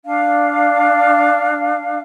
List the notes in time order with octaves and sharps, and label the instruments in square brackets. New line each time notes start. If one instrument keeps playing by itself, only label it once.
[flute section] D4 F5